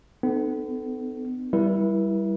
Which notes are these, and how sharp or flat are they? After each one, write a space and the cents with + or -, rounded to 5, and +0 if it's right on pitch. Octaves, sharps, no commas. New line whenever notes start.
B3 +40 D#4 -40 A4 -5
G3 +0 E4 +0 B4 -45